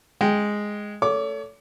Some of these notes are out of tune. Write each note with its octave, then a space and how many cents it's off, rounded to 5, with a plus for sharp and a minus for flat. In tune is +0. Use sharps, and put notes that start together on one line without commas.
G#3 +0 G5 +0
A3 +10 C#5 +35 D6 +0